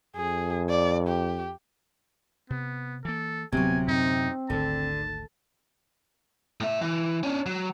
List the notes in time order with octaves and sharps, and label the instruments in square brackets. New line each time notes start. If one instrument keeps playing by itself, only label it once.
[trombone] F2 [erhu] G#4
[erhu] D5
G4
[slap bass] C3 [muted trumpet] B3
[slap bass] E3 A#3 [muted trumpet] A4
[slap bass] D1 C4 [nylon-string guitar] C3 F#3 [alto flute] B3 [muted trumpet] G#5
[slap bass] F#2 A2 D3 [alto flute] C4 [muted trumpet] D#4
[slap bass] G#1 D2 [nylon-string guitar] D3 [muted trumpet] A5
[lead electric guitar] A2 E5
E3
C#4 D4
F#3